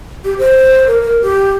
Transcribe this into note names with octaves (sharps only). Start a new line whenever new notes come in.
G4
C5
A#4
A#4
G4